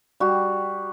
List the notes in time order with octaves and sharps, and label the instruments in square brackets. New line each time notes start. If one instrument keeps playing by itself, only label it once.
[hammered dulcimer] G3 F#4